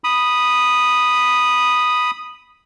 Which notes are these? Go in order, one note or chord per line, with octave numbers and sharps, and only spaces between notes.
B5 D#6